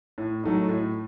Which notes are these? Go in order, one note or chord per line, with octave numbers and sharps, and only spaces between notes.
A2
F#3 A3 D#4
A2